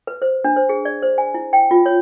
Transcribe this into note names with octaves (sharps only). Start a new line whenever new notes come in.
B4
C5
D4
C5
G#4
D5
C5
G#5
E4
G5
F4
C#5